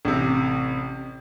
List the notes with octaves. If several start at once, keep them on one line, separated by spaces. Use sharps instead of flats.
A1 C3